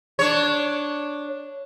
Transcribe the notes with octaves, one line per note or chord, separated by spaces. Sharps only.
D4 C#5